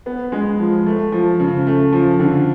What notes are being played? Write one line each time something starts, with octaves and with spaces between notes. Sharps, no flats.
B3
G#3
F3
A3
F3
C#3
A3
F3
D3